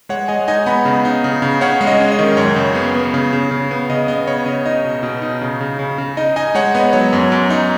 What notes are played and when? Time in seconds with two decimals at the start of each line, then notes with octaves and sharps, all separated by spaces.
0.09 G#3 C#5 F#5
0.28 G#3 D#5 G#5
0.48 D#4 D#5 G#5
0.66 B3 F#5 B5
0.85 C#3
1.05 D#4
1.24 C#3
1.42 C#3
1.61 C#4 C#5 F#5
1.81 G#3
1.87 D#5
2.00 C#4
2.12 D#5
2.19 D#3
2.37 F#2 C#5
2.56 C#3
2.75 B3
2.95 B3
3.14 C#3
3.33 C#3
3.51 C#3
3.71 B3
3.90 C#3 D#5
4.08 B3 D#5
4.27 C#3 C#5
4.46 C#3 D#5
4.66 D#4 D#5
4.84 B2
5.03 B2
5.22 D#4
5.42 C#3
5.60 C#3
5.79 C#3
5.98 C#3
6.17 D#4 D#5
6.36 D#4 D#5 G#5
6.55 G#3 C#5 F#5
6.75 B3 D#5
6.93 F#3 C#5
7.13 F#2
7.32 F#2
7.50 D#4